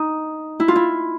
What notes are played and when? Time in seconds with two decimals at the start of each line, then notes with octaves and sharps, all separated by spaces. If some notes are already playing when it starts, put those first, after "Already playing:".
Already playing: D#4
0.60 E4
0.68 F4
0.76 E4